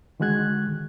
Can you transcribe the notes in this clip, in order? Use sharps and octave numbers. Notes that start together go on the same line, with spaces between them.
D3 D#3 G#3 F#4 F#6 G#6